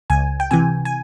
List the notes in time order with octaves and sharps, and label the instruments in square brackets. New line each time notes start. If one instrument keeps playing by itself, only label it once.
[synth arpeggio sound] C#2 G#5
G5
C3 E3 G#5
G#5